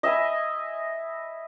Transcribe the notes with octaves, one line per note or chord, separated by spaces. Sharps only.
D#5 E5 G#5 B5